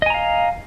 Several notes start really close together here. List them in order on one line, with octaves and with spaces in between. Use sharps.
D#5 G#5 A#5 F5